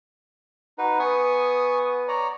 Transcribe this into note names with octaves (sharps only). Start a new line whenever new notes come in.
D#4 F#4 B4
B3 G#5 C#6 D#6
C#5 D5 A#5